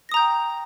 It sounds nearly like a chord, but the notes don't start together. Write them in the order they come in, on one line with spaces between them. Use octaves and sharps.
A#6 D#6 A#5 G6 G5